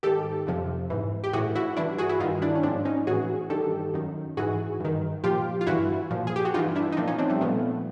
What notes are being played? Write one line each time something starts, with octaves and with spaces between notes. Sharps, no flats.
G#2 D#3 G4 A4
F2 C3 F3
G#2 E3
G4
A2 E3 F#4 G#4
E4 F#4
G2 E3 D4 E4
F#4 G#4
E4 F#4
G2 D#3 D#4 F4
D4 E4
C#4
G#2 F3 C4 D4
C#4 D#4
A2 E3 F#4 G#4
G2 D#3 G4 A4
F#2 D#3
G#2 E3 F#4 G#4
G2 D#3
A#2 F3 F4 G4
F4
G2 E3 E4 F#4
A#2 F3
G#4
G4
F#4
G2 D#4 F4
E3
D4 E4
D#4
A#2 F3 C4 D4
C#4 D#4
C4 D4
G3 A3
A#2 F3 A3 B3